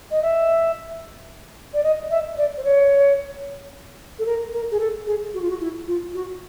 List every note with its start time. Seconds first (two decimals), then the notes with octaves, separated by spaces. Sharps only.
0.11 D#5
0.22 E5
1.74 D5
1.83 D#5
2.10 E5
2.37 D5
2.57 C5
2.64 C#5
4.19 A4
4.26 A#4
4.53 A#4
4.71 G#4
4.80 A4
5.06 G#4
5.34 F#4
5.41 F4
5.50 F#4
5.60 E4
5.87 F4
6.14 F#4